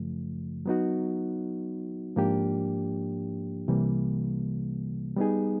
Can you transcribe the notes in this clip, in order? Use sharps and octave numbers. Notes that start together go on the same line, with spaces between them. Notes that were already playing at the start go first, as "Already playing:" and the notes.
Already playing: F#2 C#3 F3 A3
F#3 B3 D#4 F#4
G#2 F3 A#3 D4 G4
C2 C3 E3 G3 A#3
G3 B3 D#4 G#4